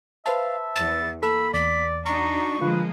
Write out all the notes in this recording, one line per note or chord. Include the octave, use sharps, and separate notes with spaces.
B4 C5 E5 F5 A5
E2 A6
A#3 A4 B5 E6
E2 D5 B6
D4 D#4 F#4 A#5 C#6
D3 F3 G#3 A#3 F4 B4